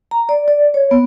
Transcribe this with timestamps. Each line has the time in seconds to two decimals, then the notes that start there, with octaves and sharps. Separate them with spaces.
0.11 A#5
0.29 D5
0.48 D5
0.74 C#5
0.91 B3